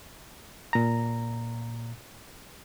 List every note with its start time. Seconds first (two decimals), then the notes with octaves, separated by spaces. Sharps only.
0.73 A#2 A#5